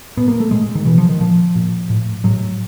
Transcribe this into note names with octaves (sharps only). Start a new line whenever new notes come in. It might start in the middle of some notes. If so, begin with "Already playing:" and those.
A#2 B3
A#3
A3
A#2 G#3
D#3
B2 E3
F3
D#3
A#2 F3
A#2
A2
A2 F#3